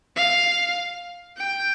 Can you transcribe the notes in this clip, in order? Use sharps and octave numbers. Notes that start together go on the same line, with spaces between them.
F5
G5